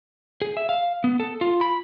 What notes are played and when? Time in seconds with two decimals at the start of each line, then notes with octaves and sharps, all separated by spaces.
0.42 G#4
0.57 E5
0.69 F5
1.04 B3
1.20 A4
1.41 F4
1.61 B5